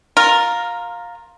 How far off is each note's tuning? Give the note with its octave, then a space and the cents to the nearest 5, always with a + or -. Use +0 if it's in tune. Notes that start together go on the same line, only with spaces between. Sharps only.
F4 +15 A#4 +0